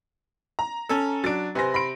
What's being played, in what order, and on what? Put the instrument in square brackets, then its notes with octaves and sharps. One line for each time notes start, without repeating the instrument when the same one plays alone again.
[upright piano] A#5
[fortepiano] C#4 A4
[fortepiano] F#3 D4 [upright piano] A6 D7
[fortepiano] C3 C5 [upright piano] B4 G#5 A#6
[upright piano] B5 C6 D7